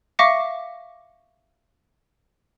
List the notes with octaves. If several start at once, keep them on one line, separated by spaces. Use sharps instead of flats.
E5 F5 C#6 D6 A#6 C#7